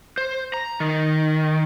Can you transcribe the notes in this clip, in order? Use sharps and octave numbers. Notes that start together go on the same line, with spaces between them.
C5
A#5
D#3